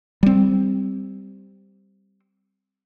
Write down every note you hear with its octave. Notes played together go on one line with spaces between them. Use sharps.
G3 C4